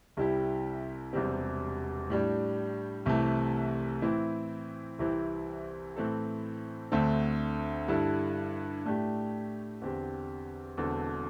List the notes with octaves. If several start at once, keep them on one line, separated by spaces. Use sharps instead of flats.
C2 C3 G3 E4 G4
E1 E2 C3 G3 C4
A2 G3 D4
C2 C3 E3 A3
A2 E3 C4 E4
C2 C3 E3 C4 E4
A2 E3 C4 A4
D2 D3 A3 C4 A4
G2 D3 G3 E4 A4
A2 A3 D4 G4
E2 D3 C4 G4
E1 E2 D3 C4 A4